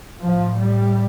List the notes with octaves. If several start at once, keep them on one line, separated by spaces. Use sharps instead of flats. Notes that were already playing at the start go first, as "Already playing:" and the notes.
A2 F3
G3